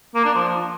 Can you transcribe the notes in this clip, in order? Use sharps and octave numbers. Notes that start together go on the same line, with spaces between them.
A#3
D4
F3